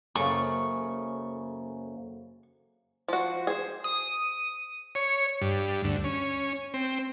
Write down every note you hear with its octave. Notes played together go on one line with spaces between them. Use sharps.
F#2 C#3 A#3 A4 C5 C#6
F3 F#4
G#4 C5
D#6
C#5
G2
D2
C#4
C4